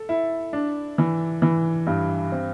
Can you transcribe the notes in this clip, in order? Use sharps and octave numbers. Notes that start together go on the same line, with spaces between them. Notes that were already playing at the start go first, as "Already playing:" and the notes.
Already playing: A4
E4
D4
E3
E3
G2
C4